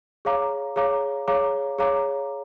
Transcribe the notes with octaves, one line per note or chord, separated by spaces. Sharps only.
G#4 C#5 F5 A#5 D6
G#4 C#5 F5 A#5 D6
G#4 C#5 F5 A#5 D6
G#4 C#5 F5 A#5 D6